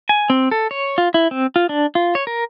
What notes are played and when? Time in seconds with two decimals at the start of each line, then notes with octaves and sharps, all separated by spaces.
0.09 G#5
0.30 C4
0.51 A4
0.71 C#5
0.98 F4
1.14 E4
1.31 C4
1.56 F4
1.69 D4
1.95 F4
2.15 C#5
2.27 A#4